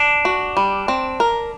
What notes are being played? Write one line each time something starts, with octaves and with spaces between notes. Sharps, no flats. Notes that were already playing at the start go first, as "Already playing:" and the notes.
Already playing: D4
F#4
G3
C4
A#4